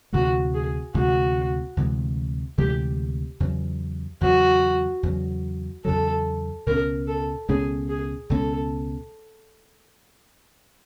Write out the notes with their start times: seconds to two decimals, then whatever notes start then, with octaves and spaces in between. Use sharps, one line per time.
0.13 D2 C3 E3 G#3 F#4
0.54 G#4
0.94 D2 C3 E3 G#3 F#4
1.77 D2 C3 E3 G#3
2.58 D2 C3 E3 G#3 G4
3.40 E2 C#3 F#3
4.21 E2 C#3 F#3 F#4
5.03 E2 C#3 F#3
5.85 E2 C#3 F#3 A4
6.66 C#2 B2 G#3 C#4 A#4
7.07 A4
7.48 C#2 B2 G#3 C#4 G#4
7.89 G#4
8.30 C#2 B2 G#3 C#4 A4